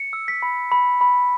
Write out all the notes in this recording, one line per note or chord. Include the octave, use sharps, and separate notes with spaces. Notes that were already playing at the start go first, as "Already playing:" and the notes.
Already playing: C#7
E6
B6
B5
B5
B5